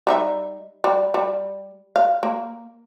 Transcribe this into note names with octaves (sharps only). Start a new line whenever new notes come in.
G3 D#4 E5
G3
G3
F5
A#3